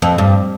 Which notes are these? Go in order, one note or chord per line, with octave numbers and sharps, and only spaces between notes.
F2
G2